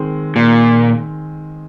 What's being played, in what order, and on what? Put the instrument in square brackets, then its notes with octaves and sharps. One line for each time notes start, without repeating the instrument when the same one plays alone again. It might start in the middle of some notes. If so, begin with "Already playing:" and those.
Already playing: [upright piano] D#3 G#3 C4
[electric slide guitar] A#2